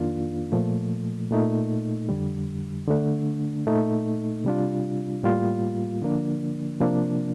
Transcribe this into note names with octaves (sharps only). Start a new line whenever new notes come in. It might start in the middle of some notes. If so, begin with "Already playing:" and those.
Already playing: F2 D#3 A#3 D4 F4
A#2 F3 A3
A#2 A3 D#4
F2 D3 G3
D3 A3 D4
A#2 A3 D#4
C3 G3 D4 F4
A2 G3 A#3 F4
D3 F3 A#3 D4
C3 F3 A#3 D4